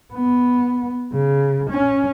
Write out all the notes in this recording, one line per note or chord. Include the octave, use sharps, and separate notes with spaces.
B3
C#3
C#4